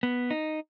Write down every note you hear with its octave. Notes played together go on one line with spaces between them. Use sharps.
B3
D#4